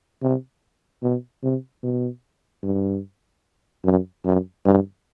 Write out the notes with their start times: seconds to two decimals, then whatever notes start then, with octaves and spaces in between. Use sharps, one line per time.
0.22 C3
1.03 B2
1.43 C3
1.83 B2
2.63 G2
3.84 F#2
4.25 F#2
4.65 G2